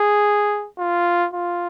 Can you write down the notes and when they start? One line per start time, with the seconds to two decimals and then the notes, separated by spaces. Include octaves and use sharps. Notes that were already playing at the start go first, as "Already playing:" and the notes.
Already playing: G#4
0.78 F4
1.34 F4